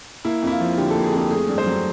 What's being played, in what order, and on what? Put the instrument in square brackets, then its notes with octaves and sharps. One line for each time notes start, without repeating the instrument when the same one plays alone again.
[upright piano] A#3 E4
F2 E4
F4
F3
D3 G4
A4
A#3
G#4
F2 G4
A3 G#4
G2
C5
F#3